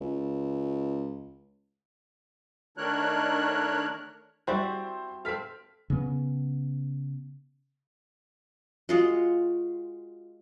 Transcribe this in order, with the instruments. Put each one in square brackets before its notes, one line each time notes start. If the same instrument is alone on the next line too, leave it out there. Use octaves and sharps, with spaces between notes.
[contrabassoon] C#2
[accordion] D#3 A3 D4 A#4 C#5 F#6
[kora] G3 C4 F#4 [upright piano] E4 C5
[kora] C4 F5 [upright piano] A4 F6 B6
[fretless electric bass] C#3 B3
[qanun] G#3 F4 F#4